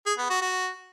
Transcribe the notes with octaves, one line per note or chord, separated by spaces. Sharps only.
G#4
B3
F#4
F#4